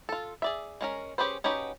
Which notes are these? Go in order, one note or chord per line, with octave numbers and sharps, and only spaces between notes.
F4 A4
G#4 D5 E5
G#3 C#4 A#4
C#4 G4 G#4 B4 C5
C#4 D#4 F#4 G4 B4